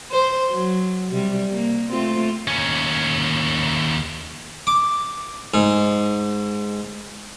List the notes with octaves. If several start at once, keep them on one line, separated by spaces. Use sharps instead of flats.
C5
F#3
C3 G3
A#3
A3 C4 F4
D#2 C#4
D6
G#2